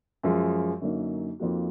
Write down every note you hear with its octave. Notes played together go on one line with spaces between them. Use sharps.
F#2 F3 G#3
F#2 D3 F#3 A#3 D#4
F2 F3 A#3 D#4 F#4